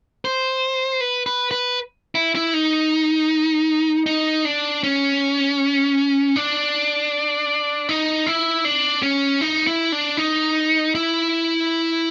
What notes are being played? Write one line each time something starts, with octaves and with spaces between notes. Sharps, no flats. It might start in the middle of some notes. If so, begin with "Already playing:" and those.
C5
B4
B4
B4
E4
E4
D#4
D#4
D4
C#4
D4
D#4
E4
D4
C#4
D#4
E4
D4
D#4
E4